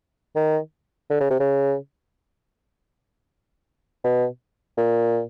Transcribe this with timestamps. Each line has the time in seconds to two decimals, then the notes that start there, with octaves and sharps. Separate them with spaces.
0.36 D#3
1.10 D3
1.20 C#3
1.30 C3
1.40 C#3
4.04 B2
4.78 A#2